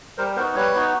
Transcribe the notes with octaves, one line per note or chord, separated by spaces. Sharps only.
G3 A#4 C5
B3 D#4 F#4 A#4 C5
G3 B4 C#5
B3 D#4 F#4